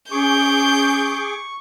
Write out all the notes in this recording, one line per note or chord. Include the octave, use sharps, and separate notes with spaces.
C#4 G#4 C#6 D6 G6